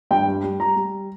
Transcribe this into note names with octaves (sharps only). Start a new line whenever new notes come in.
G2 G5
G3
G3
G3 A#5
G3